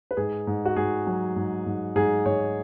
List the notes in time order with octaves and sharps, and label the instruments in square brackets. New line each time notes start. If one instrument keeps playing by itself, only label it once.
[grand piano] B4
G#2 G#4
G#2
F#4
G#2 G#4
F#3
G#2
G#2
G#2 G#4
G#2 C#5